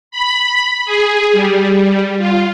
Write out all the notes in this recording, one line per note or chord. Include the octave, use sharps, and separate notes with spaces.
B5
G#4
G3
F4